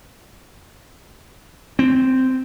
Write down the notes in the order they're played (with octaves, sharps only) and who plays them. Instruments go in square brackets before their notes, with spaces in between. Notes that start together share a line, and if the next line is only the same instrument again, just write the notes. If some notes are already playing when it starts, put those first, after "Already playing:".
[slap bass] C4